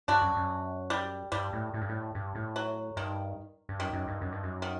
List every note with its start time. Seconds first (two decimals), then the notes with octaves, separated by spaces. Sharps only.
0.08 G2 D4 F#4
0.21 F#2
0.36 F#2
0.90 G3
1.32 G2 G3
1.53 A2
1.74 A2
1.81 G2
1.89 A2
2.15 G2
2.35 A2
2.56 F#3
2.97 G2 D#3
3.69 G2
3.79 F#2 D#3
3.93 F#2
4.08 G2
4.21 F#2
4.33 G2
4.43 F#2
4.62 D#3